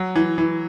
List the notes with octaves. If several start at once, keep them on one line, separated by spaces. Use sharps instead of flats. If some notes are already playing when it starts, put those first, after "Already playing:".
Already playing: F#3
E3
E3